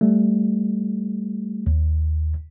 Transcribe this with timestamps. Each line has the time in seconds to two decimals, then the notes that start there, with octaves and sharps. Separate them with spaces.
0.01 G3 A3
1.66 D#2